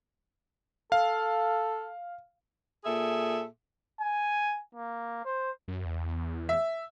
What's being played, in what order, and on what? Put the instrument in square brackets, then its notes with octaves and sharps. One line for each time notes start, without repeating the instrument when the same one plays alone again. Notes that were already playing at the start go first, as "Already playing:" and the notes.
[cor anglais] A4 [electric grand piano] F5
[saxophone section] A#2 G#4 A4 E5
[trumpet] G#5
A#3
C5
[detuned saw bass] F#2
E2
[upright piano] E5